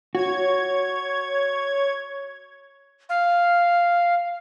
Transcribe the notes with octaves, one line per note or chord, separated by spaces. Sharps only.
F#4 C#5 G#6
F5